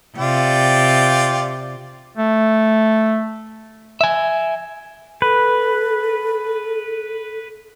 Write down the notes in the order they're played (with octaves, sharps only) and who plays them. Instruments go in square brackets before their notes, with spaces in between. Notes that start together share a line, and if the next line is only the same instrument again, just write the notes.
[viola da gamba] C3 [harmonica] F4 D5 G5
[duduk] A3
[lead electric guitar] E5 G#5
[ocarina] A4 [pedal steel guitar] B4